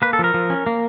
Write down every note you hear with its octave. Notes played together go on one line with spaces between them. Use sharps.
A#3 B4
A4
F3 A#4
F3
C#4
A#3